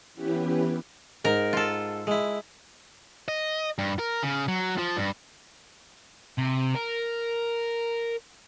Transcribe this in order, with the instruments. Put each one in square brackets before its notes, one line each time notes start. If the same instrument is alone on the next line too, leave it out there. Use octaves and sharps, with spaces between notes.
[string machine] E3 B3 C#4 E4 G4 B4
[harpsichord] G#2 [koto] A#4
[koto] F4 A4
[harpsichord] G#3 E4
[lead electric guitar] D#5
G2
A#4
C#3
F#3
F3
G2
[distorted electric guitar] C3
A#4